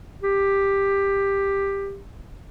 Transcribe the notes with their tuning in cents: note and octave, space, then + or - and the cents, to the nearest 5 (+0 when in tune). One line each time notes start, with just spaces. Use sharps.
G4 +10